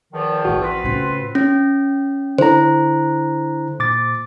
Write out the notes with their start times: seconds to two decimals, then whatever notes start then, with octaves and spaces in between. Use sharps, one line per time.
0.12 E2 D#3 F3
0.45 A1 E3 F#4
0.61 C4 F4 B4
0.84 A2 C#3
1.35 C#4
2.38 D3 E4 C5 A#5
3.79 A#2 D6 A6